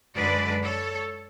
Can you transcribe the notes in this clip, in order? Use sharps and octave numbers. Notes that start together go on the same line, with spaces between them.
F#2 D3 G#3 D4 B4 D5
A4 C#5